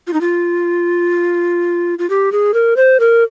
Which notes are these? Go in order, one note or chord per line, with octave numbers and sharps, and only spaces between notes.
F4
D#4
F4
F4
G4
G#4
A#4
C5
A#4